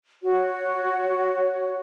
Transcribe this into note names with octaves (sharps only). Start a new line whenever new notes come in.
F#4 C#5